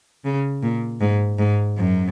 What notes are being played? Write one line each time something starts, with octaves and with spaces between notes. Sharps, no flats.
C#3
A#2
G#2
G#2
F#2